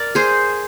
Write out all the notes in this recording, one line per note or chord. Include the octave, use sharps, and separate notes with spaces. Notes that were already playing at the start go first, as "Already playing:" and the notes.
Already playing: A#4 D5
G#4 C5